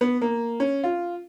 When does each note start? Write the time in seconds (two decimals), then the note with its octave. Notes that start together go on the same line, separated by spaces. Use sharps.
0.01 B3
0.21 A#3
0.60 C#4
0.83 F4